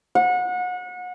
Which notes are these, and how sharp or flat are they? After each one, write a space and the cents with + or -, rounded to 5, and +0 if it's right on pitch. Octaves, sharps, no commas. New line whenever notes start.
F#5 -30